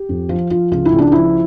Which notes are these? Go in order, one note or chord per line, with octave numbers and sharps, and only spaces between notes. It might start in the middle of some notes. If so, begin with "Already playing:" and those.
Already playing: G4
F2
F3 F4
F3 F4
C#2 F4
E4
C#2
D4
F3 E4